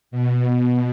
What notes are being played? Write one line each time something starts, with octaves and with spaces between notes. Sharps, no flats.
B2